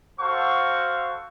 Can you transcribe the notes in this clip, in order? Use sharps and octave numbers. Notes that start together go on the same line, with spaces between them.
F#4 A4 C5 F5 F#5 C#6